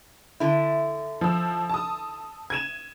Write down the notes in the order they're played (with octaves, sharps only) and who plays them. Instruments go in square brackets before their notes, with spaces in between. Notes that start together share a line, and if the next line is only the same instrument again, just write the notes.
[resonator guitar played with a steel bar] D3 E4
[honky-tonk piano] F3 E6
A5 D#6
G#6 D#7 E7